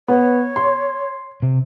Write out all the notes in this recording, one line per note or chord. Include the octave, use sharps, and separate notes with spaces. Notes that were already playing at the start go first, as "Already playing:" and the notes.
B3 C#5
C6
C3